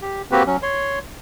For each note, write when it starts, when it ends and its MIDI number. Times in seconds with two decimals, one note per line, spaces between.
0.02 0.22 67
0.31 0.43 58
0.31 0.43 60
0.31 0.43 66
0.31 0.43 67
0.31 0.43 71
0.47 0.57 54
0.47 0.57 61
0.63 0.99 73
0.63 0.99 84